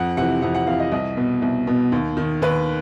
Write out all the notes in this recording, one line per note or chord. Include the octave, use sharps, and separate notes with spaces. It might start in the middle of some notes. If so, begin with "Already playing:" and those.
Already playing: F2 F#5
C3 E3 F#5
F2 F#5
F#5
C3 E3 F5
D#5
C2 D#5
B2
C2
B2
D#2
D#3
D#2 B4